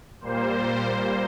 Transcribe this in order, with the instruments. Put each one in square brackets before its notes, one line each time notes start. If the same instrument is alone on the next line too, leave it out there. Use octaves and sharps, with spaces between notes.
[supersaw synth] A#2 G3 A#3 C5